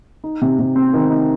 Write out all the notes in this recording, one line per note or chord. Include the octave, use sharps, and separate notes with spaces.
D#4
C3
C3
C4
D#3
D#4